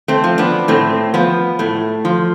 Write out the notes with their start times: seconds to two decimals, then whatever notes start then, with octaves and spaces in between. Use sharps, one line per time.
0.08 A3 C4
0.24 F3
0.38 B3 D4
0.68 A2 A3 C4
1.14 F3 B3
1.59 A2 A3
2.05 F3